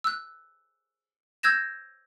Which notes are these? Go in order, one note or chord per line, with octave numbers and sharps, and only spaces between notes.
E6 F#6
E6 G6 G#6 A#6 E7